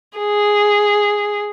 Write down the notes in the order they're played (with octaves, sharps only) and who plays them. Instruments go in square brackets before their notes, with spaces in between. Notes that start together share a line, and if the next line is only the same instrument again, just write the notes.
[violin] G#4